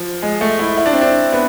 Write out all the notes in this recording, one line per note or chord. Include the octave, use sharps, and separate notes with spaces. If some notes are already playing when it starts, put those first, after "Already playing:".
Already playing: F3
G#3
A3
E4
E4
D4
C4
D4
B3